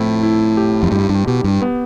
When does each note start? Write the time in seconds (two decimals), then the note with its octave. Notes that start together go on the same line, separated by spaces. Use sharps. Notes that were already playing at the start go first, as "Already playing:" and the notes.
Already playing: A2 F3 C4 E4
0.23 E4
0.57 G4
0.83 F2
0.92 G2 G4
1.09 G2
1.27 B2 G4
1.44 G2
1.62 B3